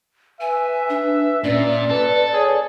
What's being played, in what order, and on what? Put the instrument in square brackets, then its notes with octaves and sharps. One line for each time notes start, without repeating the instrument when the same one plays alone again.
[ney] B4 [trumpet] E5 [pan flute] G#5
[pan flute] D4
[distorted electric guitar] A#2 [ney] C#4 [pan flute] D5
[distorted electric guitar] A4 [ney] B4
[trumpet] G#4 [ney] C#5